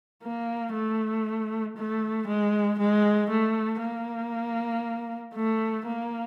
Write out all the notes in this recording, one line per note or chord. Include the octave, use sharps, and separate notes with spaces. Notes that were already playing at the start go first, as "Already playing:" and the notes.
A#3
A3
A3
G#3
G#3
A3
A#3
A3
A#3